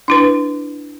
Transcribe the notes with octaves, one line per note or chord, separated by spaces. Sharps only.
D4 E4 B4